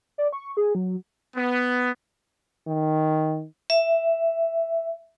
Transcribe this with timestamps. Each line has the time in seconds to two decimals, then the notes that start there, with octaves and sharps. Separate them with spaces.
0.18 D5
0.33 C#6
0.57 G#4
0.75 F#3
1.35 B3
2.67 D#3
3.70 E5